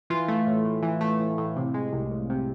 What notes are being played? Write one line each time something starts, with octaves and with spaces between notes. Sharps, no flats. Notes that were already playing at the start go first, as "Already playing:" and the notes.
E3 F4
A3
A2
A2
E3
A3
A2
A2
C3
G#3
C2
C2
C3